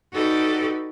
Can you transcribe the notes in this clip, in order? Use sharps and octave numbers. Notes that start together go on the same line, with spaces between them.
D#4 F#4 G4 A4 B4 D5